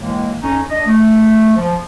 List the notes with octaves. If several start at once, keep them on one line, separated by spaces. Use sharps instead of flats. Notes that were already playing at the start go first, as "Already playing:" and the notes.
A2 E3 G#3 A#3
F2 C#4 D#4
D4 D#5
A3
F3